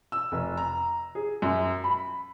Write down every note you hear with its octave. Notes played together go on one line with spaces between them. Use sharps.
E6
F1
A#5
G#4
F#2
B5